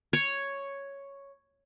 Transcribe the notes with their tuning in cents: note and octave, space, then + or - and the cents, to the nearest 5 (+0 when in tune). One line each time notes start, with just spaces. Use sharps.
C#5 +0